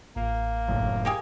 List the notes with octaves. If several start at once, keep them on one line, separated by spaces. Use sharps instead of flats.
A1 A#3
F#1 A2 F#3
C3 A#3 G4 G#4